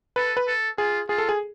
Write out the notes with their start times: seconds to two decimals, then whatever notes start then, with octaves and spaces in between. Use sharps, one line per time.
0.16 A4 B4
0.37 B4
0.47 A4
0.78 F4 G#4
1.09 F4 G#4
1.18 A4
1.29 G#4